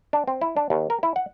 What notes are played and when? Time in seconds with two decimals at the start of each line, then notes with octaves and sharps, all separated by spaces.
0.13 D4
0.28 C4
0.41 E4
0.57 D4
0.70 D#2
0.90 A#4
1.03 E4
1.16 F#5